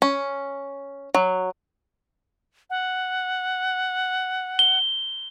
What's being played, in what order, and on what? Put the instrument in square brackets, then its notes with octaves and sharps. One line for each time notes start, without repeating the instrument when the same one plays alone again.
[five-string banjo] C#4
F#3
[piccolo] F#5
[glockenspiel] G7